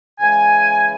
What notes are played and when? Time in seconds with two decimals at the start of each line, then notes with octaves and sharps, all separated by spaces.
0.19 C#3 E3 G#3 G#5